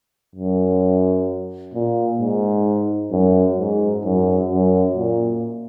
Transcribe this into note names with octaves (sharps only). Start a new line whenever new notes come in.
F#2
A#2
G#2
F#2
G#2
F#2
F#2
A#2